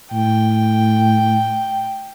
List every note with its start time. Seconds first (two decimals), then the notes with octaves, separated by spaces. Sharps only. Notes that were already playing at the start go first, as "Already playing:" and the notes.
0.12 A2 G5